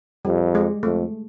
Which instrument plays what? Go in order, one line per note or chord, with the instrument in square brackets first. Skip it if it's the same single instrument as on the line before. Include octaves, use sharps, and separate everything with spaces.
[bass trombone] F2 [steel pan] G3
[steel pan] G#3
[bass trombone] F2 [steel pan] A3